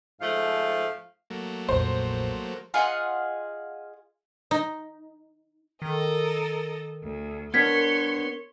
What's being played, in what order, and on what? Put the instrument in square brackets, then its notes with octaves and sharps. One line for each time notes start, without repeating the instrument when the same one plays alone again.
[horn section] G#2 F3 A3 [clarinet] F5
[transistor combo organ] F#3 A3 A#3
[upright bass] A#1 F2 [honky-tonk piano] C5
[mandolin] F4 G#4 D#5 F#5
[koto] D#4
[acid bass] D#3 [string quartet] A4 A#4 D#5
[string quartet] D2
[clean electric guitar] B3 D4 [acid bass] A#4 [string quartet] C#5 C6 C#6 [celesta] G#6 B6